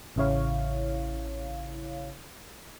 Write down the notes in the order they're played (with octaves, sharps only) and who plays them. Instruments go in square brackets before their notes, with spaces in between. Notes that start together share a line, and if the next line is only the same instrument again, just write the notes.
[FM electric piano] A1 C#3 E4 C#5 F5